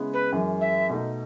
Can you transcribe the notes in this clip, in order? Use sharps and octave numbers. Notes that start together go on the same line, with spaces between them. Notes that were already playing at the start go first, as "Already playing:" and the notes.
Already playing: C#3 G#3 B3 E4
B4
F#2 E3 G#3
E5
B2 A3 D#4